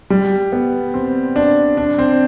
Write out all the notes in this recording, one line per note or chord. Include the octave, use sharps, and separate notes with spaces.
G3
B3
C4
D4
D4
C4